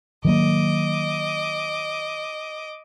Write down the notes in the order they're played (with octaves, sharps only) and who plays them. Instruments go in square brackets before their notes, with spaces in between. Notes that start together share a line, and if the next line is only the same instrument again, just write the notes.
[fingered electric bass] D#3 F#3 A#3 [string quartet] D#5 D6